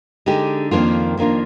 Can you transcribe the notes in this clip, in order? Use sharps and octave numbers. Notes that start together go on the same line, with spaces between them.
D3 G#3 D#4 G4
F2 D#3 A#3 D4 F4
F2 D#3 A#3 D4 F4